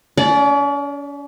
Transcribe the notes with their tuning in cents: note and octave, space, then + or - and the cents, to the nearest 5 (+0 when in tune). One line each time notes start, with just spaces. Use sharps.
C#4 +40 D5 +0